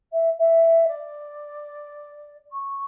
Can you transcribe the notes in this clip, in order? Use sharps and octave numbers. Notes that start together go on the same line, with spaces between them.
E5
E5
D5
C#6